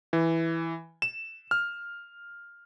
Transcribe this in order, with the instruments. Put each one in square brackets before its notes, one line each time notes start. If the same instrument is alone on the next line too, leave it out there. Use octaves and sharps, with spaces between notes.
[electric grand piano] E3
E7
F6